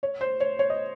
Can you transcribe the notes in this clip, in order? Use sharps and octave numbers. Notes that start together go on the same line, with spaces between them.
C#5
C5
C#5
C#5
D#5